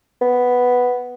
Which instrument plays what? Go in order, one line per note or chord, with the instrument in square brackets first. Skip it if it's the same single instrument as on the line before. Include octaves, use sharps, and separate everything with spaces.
[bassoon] B3